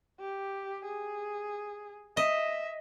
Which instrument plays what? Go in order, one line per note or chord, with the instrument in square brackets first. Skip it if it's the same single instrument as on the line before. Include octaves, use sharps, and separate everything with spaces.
[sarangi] G4
G#4
[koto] D#5 [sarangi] E5